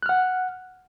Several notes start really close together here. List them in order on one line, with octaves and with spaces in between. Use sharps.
F#6 F6 F#5